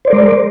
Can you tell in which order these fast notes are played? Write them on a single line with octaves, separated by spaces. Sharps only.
C5 D5 A#4 G#3